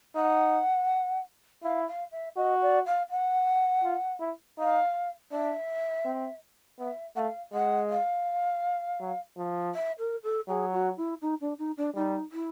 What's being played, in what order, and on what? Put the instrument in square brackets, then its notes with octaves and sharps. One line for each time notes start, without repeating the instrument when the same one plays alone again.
[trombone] D#4 [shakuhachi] F#5
[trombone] E4 [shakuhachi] F5
[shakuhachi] F5
E5
[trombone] F#4 [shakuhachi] D#5
[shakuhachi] D5
F5
F#5
[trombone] F4
E4
[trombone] D#4 [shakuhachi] F5
[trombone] D4 [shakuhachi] E5
[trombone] C4
[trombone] B3 [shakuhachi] E5
[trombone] A3 [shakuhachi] F5 F#5
[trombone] G#3 [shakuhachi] F#5
[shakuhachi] F5
[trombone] F#3
F3
[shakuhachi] E5
A#4
A4
[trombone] F#3 [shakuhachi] G#4
[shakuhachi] F#4
E4
D#4
D4
D#4
D4
[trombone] G3 [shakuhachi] D#4
[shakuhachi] E4